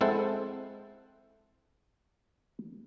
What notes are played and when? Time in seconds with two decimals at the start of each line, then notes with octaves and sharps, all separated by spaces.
0.01 G#3 C4 E4 A4 C5 F#5